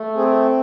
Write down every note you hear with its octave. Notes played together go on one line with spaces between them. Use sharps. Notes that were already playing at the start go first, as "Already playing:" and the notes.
Already playing: A3
C4 G#4